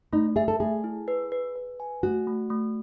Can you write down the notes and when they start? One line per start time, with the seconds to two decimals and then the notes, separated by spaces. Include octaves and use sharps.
0.13 A3 D#4
0.36 G#4 E5
0.48 A4
0.60 A3 G#4
0.84 E4
1.08 B4
1.32 B4
1.56 B4
1.80 G#5
2.03 A3 F#4
2.27 A3
2.50 A3